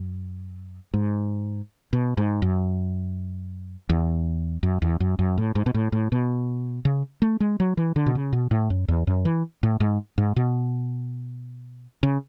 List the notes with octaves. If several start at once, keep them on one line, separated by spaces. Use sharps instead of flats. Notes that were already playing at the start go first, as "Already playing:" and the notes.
Already playing: F#2
G#2
B2
G#2
F#2
E2
F#2
E2
F#2
F#2
A2
G#2
B2
A2
A2
B2
C#3
A3
G#3
F#3
E3
D3
B2
C#3
B2
A2
F#2
E2
F#2
E3
A2
G#2
G#2
B2
C#3